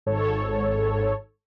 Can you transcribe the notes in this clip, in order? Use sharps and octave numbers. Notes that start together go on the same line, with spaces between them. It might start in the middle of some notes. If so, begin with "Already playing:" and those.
G#1 G#2 A4 C#5